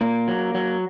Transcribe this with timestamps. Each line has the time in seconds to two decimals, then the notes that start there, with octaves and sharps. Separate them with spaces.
0.01 A#2 A#3
0.28 F#3
0.55 F#3